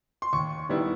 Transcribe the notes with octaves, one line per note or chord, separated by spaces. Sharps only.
C6
D#2 C#6
D#3 G3 B3 E4